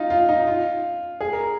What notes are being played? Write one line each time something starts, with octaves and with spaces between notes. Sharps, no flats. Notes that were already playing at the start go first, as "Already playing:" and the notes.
Already playing: D#4 F4
F4
D#4
F4
G#4
A#4